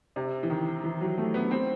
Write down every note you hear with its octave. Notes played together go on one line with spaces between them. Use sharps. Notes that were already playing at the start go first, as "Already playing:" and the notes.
C3
E3
D#3
E3
F#3
A3
B3
C4